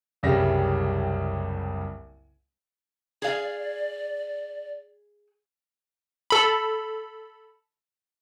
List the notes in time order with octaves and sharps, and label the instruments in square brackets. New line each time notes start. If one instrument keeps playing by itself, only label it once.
[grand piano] F#1 C2 C#3 G3 E5 A#6
[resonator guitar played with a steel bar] G#4 F5 [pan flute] D5
[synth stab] A4 B5